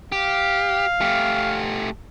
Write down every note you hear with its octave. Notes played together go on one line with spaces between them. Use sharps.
G4 F5
A3 G4